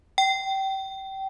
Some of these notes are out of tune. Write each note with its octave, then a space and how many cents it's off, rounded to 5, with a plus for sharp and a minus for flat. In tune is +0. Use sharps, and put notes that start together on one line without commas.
G5 -25